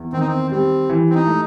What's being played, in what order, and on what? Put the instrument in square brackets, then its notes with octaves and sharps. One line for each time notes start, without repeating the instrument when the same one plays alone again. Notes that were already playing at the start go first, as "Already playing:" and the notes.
Already playing: [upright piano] E2
[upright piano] D#3 [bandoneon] C4
[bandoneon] D#4
C4
[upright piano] G3 [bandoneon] C4
[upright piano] E3
[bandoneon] C4
D#4
[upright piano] A3